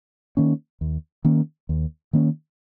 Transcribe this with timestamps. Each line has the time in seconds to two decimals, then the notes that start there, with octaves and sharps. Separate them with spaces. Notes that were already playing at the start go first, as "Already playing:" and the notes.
0.37 D#3 A#3 C#4
0.81 D#2
1.25 D#3 A#3 C#4
1.69 D#2
2.13 D#3 A#3 C#4